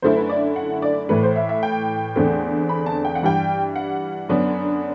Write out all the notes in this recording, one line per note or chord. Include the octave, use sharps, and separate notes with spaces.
F#2 D3 A3 E4 C5
B4
D5
F#5
D5
A2 E3 A3 B4
C5
E5
E5
G5
E2 D3 A3 C4
B5
A5
G5
F#5
G2 E3 G3 G5
F#5
F#2 D3 F#3 B3 D4